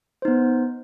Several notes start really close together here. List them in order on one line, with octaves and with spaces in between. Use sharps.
C5 D#4 B3